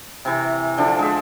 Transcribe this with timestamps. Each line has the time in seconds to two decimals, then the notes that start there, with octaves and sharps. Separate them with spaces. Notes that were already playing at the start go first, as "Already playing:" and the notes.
0.25 C3 E3
0.78 D3 F3 D4
0.99 G#3 E5